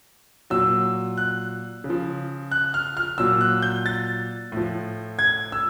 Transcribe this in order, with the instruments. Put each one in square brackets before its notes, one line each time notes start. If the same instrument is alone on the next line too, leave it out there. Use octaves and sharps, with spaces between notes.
[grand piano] A#2 F#3 E6
F#6
C#3
F3
F#6
F6
F6
A#2 F#3 E6
F#6
G6
A6
A2 F3
G#6
E6